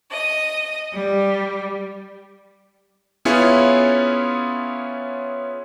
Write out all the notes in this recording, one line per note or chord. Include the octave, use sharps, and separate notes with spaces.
D#5
G3
B3 C#4 E4 F4 G#4 C#5